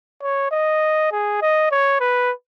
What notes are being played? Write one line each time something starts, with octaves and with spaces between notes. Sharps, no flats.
C#5
D#5
G#4
D#5
C#5
B4